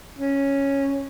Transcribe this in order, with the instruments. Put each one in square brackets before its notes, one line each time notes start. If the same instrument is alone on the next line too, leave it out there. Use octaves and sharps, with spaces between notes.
[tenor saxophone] C#4